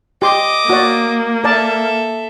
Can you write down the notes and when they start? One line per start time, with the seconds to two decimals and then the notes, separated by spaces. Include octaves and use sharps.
0.22 G4 D#5 C6 D6
0.70 A#3 F#4 D5
1.44 A4 A#4 D5 E5 A5